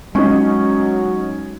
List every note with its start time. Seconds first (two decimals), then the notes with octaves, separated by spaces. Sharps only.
0.15 F#3 G#3 C#4 D#4